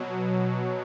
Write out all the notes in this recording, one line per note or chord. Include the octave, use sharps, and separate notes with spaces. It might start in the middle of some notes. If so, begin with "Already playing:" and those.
Already playing: B2 F#3